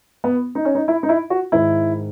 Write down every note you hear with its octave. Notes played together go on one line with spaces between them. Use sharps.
B3
D#4
C#4
D#4
E4
D#4
E4
F#4
G#2 D#3 E4